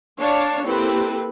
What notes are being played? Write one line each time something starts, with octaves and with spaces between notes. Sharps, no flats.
D4 C#5 F5 A5
A#3 C4 E4 G4 A4 B4